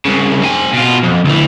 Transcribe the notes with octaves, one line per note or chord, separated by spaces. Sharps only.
C2 C#3
C4 G#5
B2 F4
F2
D2 E3